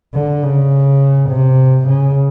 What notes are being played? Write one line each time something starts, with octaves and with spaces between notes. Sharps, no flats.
D3
C#3
C3
C#3